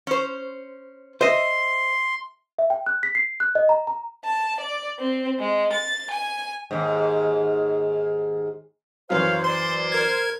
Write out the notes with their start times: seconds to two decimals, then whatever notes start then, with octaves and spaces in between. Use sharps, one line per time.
0.07 C#4 C5
1.21 C5 D#5 E5 C6
2.59 E5
2.70 G5
2.86 F#6
3.03 B6
3.15 C7
3.40 F#6
3.55 D#5
3.69 A#5
3.87 A#5
4.24 A5
4.61 D5
4.99 C4
5.39 G#3
5.74 A6
6.11 G#5
6.71 D#2 G#2
9.10 F#2 E3 C5 C#5 F5 C6
9.44 C5 D5 C6
9.92 A#4 G#6